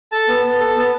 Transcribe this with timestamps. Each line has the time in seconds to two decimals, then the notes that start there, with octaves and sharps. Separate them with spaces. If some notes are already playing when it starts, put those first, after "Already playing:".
0.12 A4 A5
0.28 B3
0.44 B3
0.60 A4
0.76 B3